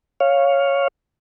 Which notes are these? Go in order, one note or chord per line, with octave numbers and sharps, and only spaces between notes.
C#5 F5